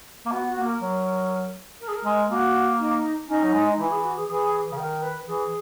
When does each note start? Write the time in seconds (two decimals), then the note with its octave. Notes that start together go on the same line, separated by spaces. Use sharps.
0.26 A#3
0.31 B3 F#4
0.48 F#4
0.57 A#3
0.64 A#4
0.81 F#3
1.80 A#4
1.87 G#4
1.95 A#4
2.05 G#3
2.30 A#3 F#4
2.79 D#4
3.28 C#4 D#4
3.43 F#3
3.53 G#3
3.68 D#4
3.79 E3 E4
3.90 G#4
4.03 F#4
4.15 G#4
4.27 E3 G#4
4.72 C#3
4.77 D#3 A#4
4.97 A#4
5.02 B4
5.27 E3 G#4